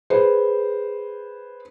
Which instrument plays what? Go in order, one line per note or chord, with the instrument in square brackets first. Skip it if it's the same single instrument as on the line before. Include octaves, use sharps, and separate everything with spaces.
[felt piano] G#4 B4 C5